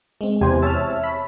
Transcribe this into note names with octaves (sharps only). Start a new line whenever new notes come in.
G#3 C4
E2 C3 G4 C5 G#5
C#5 E5 A5 E6 F6
B5